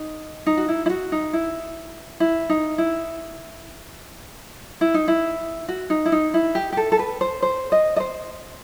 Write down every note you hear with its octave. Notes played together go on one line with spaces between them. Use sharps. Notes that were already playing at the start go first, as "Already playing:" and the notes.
Already playing: D#4
D#4
F#4
E4
E4
F#4
D#4
E4
E4
D#4
E4
E4
D#4
E4
F#4
D#4
E4
D#4
E4
G4
G4
A4
A4
B4
C5
C5
D#5
D#5
C5